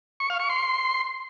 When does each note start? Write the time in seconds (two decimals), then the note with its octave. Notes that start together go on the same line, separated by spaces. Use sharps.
0.20 C#6
0.30 F5
0.40 C#6
0.49 C6